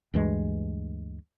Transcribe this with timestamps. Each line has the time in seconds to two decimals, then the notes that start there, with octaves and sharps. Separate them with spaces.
0.14 D2 G2 E3 G#3